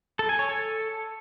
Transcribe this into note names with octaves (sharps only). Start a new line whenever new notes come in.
A4
G#5
C#5
A4